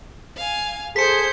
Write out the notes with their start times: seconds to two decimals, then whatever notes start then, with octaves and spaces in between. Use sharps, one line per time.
0.37 F5 G#5
0.96 G#4 A4 C5 G6 B6 C#7